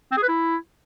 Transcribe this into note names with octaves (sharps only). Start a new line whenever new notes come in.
C4
G#4
B4
E4